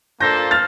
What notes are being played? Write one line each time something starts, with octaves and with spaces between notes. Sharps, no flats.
A#3 D4 F4 A4 C5 G6 A#6
F6 A6